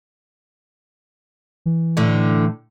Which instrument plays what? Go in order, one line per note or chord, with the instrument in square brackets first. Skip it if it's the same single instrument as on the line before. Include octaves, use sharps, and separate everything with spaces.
[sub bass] E3
[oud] A2 D3